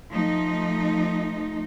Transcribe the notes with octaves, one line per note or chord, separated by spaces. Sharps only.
F3 A3 D#4